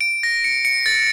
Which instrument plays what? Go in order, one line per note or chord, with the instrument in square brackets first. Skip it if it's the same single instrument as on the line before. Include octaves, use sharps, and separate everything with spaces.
[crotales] D7
A#6
C#7
C#7
A6